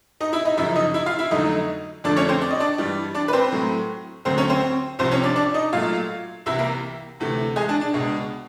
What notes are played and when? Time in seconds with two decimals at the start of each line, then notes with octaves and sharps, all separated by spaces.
0.21 D#4 D#5
0.33 E4 E5
0.45 D#4 D#5
0.57 F#2 C#3 F3 E4 E5
0.76 D#4 D#5
0.94 E4 E5
1.06 F4 F5
1.19 E4 E5
1.31 F2 D3 F#3 A3 D#4 D#5
2.04 F2 D3 F3 A3 D4 D5
2.16 C#4 C#5
2.29 C4 C5
2.42 D5
2.51 D#5
2.60 D4 D5
2.78 G2 E3 G3
3.14 D4 D5
3.28 B4
3.33 C4 C5
3.52 A2 F#3 A3
4.25 D2 D3 F#3 A3 C4 C5
4.38 C#4 C#5
4.50 C4 C5
4.99 C2 C3 F3 C4 C5
5.11 C#4 C#5
5.24 D4 D5
5.36 D4 D5
5.54 D#4 D#5
5.73 A#2 F#3 A3 F4 F5
6.46 C2 C3 E3 E4 E5
6.59 A#3 A#4
7.20 D2 C3 E3 A3
7.56 G#3 G#4
7.69 D4
7.81 D4
7.93 C#2 B2 G#3